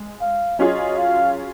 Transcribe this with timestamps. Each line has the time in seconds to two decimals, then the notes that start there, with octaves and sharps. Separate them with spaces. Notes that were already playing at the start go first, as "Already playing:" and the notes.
Already playing: G#3
0.21 F5
0.59 F#3 C#4 F4 G#4 D#5
0.98 F5